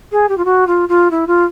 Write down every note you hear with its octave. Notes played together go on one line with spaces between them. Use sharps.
G#4
G4
F4
F#4
F4
F4
E4
F4